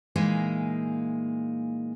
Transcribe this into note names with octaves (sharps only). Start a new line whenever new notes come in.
A#2 E3 G#3 A#3 D#4